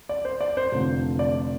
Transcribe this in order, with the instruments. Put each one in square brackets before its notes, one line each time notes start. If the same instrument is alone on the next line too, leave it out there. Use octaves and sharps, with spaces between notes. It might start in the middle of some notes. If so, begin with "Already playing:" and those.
[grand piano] D5
C5
D5
C5
[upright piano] F1 F2 D3
[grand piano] D5